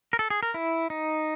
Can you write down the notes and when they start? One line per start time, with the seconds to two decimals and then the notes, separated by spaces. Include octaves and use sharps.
0.13 A#4
0.19 A4
0.30 G#4
0.43 A#4
0.54 E4
0.90 D#4